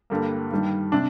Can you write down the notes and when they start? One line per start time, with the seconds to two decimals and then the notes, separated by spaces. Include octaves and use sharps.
0.10 G2 D3 G3 A#3
0.51 G2 D#3 G3
0.92 C3 D4